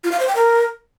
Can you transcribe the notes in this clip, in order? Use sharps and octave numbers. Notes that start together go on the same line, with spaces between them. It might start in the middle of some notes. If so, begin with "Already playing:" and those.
F4
F5
C5
G5
A#4